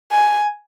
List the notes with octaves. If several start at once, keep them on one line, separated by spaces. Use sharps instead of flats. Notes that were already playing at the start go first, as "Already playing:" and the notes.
G#5